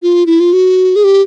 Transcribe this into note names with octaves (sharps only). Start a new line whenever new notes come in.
F4
E4
F4
F#4
G#4
G4